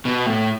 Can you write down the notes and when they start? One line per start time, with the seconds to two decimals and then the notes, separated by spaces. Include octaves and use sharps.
0.05 B2
0.26 A2